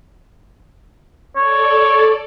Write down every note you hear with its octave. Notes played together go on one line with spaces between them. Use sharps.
A4 C#5 D5